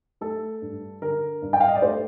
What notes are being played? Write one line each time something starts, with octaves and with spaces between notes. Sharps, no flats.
A3 A4
G2
D3 A#4
G2
G5
F5
D#5
D5
A3 C5